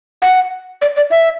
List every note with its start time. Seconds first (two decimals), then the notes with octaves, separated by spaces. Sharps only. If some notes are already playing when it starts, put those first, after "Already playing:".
0.22 F#5
0.82 D5
0.96 D5
1.11 E5